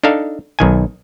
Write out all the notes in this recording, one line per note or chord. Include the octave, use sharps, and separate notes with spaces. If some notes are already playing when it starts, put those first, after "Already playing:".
D4 D#4 A4 F5
B1 D#3 G#5